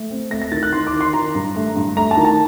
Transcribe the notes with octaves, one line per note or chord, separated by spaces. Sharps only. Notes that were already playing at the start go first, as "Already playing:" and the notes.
Already playing: A3
C4
A3 A#6
A#6
D#3 A6
F#6
D#4 C6
D6
D#3
C6
D#3 A#5
G2
A3
G2
A3 A#5
A5
D#3
A5